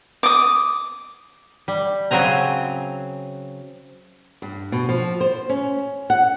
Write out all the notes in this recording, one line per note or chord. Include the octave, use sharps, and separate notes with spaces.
D6 D#6
G3
C#3 F#3 C4 G#5 A#5
G2
B2
F3
C5
C#4
F#5